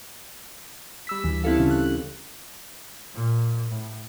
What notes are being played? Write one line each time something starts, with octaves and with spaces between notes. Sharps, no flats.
G3 E6 B6
D2 E3
C4 D4 E4 G4 A4 F5
C#3 C#4
F#6
A#2
A2